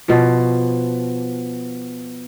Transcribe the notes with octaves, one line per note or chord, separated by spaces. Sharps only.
B2 F3